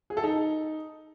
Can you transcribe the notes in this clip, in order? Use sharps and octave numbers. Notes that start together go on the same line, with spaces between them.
G#4
A4
D#4